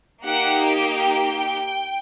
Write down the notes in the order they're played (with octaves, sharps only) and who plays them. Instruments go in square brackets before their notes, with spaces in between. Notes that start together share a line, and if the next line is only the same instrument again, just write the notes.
[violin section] A#3 D#4 G4 F#5
G5